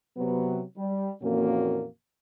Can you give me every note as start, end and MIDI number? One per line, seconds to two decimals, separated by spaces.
0.17 0.62 48
0.17 0.62 54
0.17 0.62 59
0.77 1.11 55
1.22 1.86 41
1.22 1.86 46
1.22 1.86 52
1.22 1.86 58
1.22 1.86 61
1.22 1.86 66